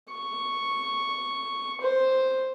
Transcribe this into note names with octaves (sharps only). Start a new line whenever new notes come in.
C#6
C5